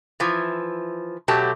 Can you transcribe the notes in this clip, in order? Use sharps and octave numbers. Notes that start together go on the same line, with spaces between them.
E3 F3
B2 F#3 A3 G4 A5